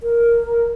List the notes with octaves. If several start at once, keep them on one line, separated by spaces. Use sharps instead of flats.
A#4